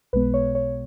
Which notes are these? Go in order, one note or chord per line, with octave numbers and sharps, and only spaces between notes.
B1 B2 G#3 B3 B4
C#5
C#5